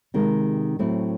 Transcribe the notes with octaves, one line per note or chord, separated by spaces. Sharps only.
C3 D#3 G#3
A2 F#3 A3 C4 E4